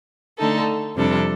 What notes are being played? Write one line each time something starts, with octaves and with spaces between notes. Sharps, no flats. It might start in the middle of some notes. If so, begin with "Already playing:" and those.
D3 A3 D#4 A4
F2 C3 G3 D4 A4